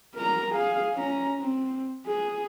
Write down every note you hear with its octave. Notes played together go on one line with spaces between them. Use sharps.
A#4 A#5
G#4 F5
C#4 A#5
C4
G#4